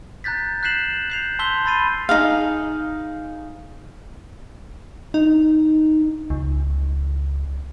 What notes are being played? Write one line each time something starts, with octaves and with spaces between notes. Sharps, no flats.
A#5 F#6 G6 A6 B6
F#6 G6 B6 C7 E7 F#7
G6 C7 F7
A5 C6 E6 G6 B6 G7
B5 C6 A6 C7 D#7 G7
D#4 G#4 F5
D#4
C#2